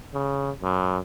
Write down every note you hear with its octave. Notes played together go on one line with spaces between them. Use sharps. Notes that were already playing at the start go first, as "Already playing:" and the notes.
C#3
F#2